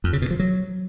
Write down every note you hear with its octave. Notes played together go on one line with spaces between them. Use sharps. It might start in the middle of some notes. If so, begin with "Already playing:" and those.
F2
C#3
B2
F3
F#3